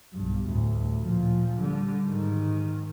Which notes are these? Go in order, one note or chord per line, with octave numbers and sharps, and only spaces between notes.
B1 G2
D2 A2
A#2 F3
D3 G3
G#2 D#3